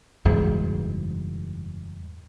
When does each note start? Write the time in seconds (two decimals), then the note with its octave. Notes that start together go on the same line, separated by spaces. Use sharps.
0.25 F#1 E2 G#2 G3